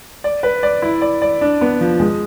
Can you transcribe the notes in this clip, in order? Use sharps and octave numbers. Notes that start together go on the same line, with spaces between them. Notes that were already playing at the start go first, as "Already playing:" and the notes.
D5
B4
D5
E4
D5
D5
D4
B3
F3
G#3